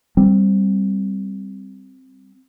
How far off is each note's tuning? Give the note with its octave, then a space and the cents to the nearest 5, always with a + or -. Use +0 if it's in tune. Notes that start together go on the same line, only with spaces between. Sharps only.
G3 +0 C4 +0